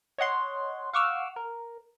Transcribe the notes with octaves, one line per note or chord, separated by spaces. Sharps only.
C#5 D#5 F#5 C6
F5 F#5 C#6 D6 E6 F6
A#4